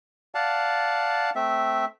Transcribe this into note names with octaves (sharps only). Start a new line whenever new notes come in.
D5 F5 F#5 A5
A3 C4 E5